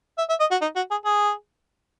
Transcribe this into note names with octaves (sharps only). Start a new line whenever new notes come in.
E5
E5
D#5
F#4
D#4
F#4
G#4
G#4